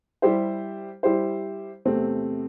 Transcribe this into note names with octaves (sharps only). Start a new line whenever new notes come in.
G3 E4 G4 C5
G3 E4 G4 C5
E2 C3 A3 C4